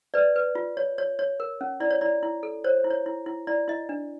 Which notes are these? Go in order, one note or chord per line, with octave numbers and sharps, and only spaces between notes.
B4 D5
B4
F4
C#5
C#5
C#5
A#4
C#4
E4 D5
C#5
E4 D5
E4
A4
C5 C#5
E4
C#5
E4
E4
E4 D5
E4 D#5
D4